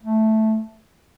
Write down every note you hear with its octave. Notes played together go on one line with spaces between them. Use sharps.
A3